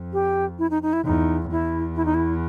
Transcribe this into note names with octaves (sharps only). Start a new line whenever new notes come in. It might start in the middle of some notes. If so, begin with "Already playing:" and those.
Already playing: F2
G4
E4
D#4
D#4
E4
E2 D#4
E2 E4
E4
D#4
E4